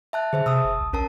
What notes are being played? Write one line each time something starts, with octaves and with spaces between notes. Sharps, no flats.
E5 A5 F#6
D3 G#4 C5 E5
C3 A5 D#6 E6
F#1
C#2
A#1 C#4 A#4 A5